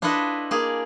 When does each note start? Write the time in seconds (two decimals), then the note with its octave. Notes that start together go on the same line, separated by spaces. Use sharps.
0.02 D4 E4 F4 A4 B4 D#5
0.51 A#3 G#4 D5